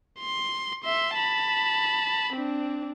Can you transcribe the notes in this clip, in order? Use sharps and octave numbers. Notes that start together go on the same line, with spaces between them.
C6
E5 C6
A5 B5
C4 D4